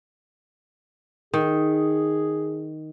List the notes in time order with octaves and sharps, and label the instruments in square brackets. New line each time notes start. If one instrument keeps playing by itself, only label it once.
[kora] D#3 [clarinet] G#4